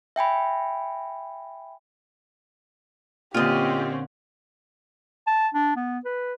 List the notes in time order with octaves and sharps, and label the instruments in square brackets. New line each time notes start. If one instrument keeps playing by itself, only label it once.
[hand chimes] E5 G5 G#5 B5
[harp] A#2 D3 [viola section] C4 C#4 [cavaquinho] F4 D#5 [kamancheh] G4
[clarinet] A5
D4
B3
B4